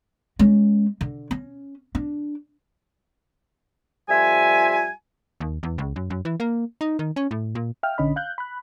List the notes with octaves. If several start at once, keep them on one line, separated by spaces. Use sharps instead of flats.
G#3 C#4
D3
C#4
D4
F2 G3 F4 E5 G#5
D#2
E2
C#2
F#2
F#2
E3
A#3
D#4
D#3
C#4
A2
A#2
E5 F5 G5 F6
A#1 D3 C#4 D#5 B5
F5 F#6 G6
B5 F#6